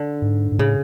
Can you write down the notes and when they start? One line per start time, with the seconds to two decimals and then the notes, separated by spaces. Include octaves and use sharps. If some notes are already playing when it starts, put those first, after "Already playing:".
Already playing: D3
0.22 G#2
0.52 G#2
0.59 A2 C#3